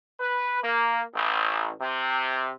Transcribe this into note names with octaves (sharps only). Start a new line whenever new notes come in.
B4
A#3
A1
C3